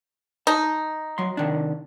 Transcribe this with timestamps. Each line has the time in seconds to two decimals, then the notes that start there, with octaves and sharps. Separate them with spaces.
0.47 D#4 A5
1.18 F#3 C6
1.37 C3 D#3 D4